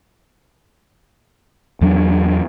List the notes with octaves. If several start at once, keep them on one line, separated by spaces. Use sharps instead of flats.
E2 F#3 C#4 D4